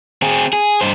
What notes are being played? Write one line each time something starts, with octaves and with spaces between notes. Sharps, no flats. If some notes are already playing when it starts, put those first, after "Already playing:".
C4 G#4
G#4
G2 C5